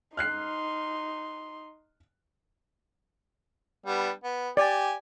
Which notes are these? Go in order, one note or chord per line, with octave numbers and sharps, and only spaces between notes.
D#4 C6 F6 F#6 C7
G3 B3 D4
B3
G4 D5 G#5